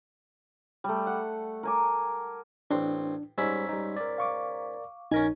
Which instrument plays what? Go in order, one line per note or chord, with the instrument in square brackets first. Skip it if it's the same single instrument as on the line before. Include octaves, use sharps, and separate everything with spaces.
[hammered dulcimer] G3 A3
F#5
A#4 G#5 D6
[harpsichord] A1 C4 C6 [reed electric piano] D4
[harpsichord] G#2 C#4 B5 [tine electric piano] G3 D#4 [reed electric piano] E6
[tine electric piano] G3 D#4
A#4 D5
[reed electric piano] F5 C#6 D6
[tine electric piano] A#1 [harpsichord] C#4 A#4 G#5 [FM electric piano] D#4